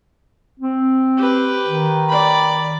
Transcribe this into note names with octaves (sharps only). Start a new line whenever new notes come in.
C4
G4 B4
D#3
D5 B5